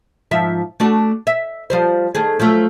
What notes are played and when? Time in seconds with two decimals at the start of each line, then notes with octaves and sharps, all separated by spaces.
0.31 G#2 F3 E5
0.80 A3 D4 F#4
1.27 E5
1.70 F3 G3 C5
2.15 D#3 A3 G#4
2.40 F3 F#3 A3